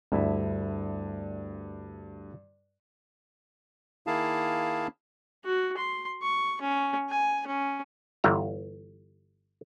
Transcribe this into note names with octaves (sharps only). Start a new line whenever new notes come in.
D2 G2 E4 E5
D#3 A#3 E4 G#4 F5 A5
F#4
C6
C#6
C#4
G#5
C#4
G1 E3 G3 A#5